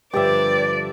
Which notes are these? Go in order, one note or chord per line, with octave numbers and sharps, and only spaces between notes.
G2 D3 F3 G4 B4 D5 E5